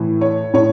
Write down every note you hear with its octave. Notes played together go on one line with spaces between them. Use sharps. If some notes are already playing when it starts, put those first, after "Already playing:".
Already playing: A2 E3
C#5
A2 C#5